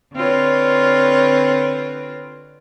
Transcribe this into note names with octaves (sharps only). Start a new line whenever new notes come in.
D3 C4 F4 B4 C#5